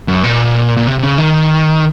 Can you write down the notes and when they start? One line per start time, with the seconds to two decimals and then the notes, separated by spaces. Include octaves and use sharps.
0.08 F#2
0.24 A#2
0.77 A#2
0.87 C3
0.99 C3
1.03 C#3
1.18 D#3